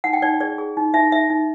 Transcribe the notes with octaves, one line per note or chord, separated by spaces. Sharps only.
D#4 F#5
G5
D#4 D5
G#4 D5
G#4
D#4
D#4 E5
D#4 E5
D#4